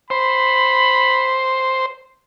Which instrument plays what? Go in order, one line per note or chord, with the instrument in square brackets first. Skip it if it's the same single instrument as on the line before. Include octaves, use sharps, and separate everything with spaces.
[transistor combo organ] C5 [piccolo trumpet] B5